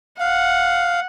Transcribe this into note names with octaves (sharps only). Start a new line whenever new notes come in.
F5 F#5